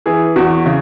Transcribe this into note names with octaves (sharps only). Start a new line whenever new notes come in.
E3 G#4
E2 F#4
C#3